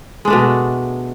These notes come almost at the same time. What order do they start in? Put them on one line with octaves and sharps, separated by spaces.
G#3 D4 A3 B2